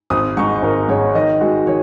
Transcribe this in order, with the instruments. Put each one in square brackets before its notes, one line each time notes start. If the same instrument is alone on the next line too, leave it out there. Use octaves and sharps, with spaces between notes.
[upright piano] G#1 [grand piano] D#6
[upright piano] G#2 G#3 D#4 [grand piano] C#6
[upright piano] G#1 [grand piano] A#4
[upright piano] G#2 G#3 D#4 [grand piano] C#5
[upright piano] D#3 [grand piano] D#5
[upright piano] G#3 F#4
[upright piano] D#3 [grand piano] C#5